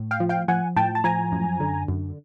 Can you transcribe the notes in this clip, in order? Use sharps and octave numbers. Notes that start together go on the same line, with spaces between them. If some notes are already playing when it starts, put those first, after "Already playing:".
Already playing: A2
F5 G5
F3
F5 G5
F3 F#5 G#5
A2 G5 A5
A5
F3 G#5 A#5
F#2
D3
F#2